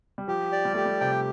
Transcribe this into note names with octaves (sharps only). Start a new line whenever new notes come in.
G3
F3 G4
D5
G3
A3 G4
G3
C3 G5